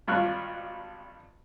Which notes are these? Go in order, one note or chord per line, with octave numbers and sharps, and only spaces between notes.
G#1 G2 A#2 F4 C#6 F#6